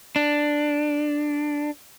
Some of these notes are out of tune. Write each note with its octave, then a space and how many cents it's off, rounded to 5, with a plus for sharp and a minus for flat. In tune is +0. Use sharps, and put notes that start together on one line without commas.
D4 +5